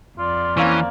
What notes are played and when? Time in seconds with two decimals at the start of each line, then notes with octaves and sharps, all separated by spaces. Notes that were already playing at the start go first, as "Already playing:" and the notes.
0.18 F2 F4 D5
0.57 E3 A#3 C4 C#4